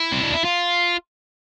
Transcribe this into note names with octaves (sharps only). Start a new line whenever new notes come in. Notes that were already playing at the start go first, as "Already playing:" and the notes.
Already playing: E4
C4
D4
E4
F4